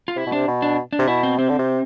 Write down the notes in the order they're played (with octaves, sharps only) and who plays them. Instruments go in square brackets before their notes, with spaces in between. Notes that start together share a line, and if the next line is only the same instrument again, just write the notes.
[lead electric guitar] F4
[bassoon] C3 [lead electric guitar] E4
[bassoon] B2
[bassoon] C3 [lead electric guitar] D4
[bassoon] B2
[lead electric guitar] D4
D4
[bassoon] C3
[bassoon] B2 [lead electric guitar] E4
[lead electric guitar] C4
[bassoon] C3 [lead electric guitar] C4
[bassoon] D3
C3